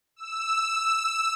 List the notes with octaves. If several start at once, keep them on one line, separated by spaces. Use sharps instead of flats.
E6